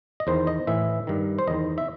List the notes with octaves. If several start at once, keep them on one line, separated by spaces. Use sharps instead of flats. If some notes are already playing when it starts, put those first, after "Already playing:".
D#5
E2 D#3 C5
D#5
A2 E3 E5
G2 D#3
C5
E2 D#3 D#5
E5